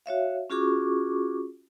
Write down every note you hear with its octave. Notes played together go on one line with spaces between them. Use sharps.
F#4 C#5 E5 F5
C#4 F4 F#4 G#4 C#6 D6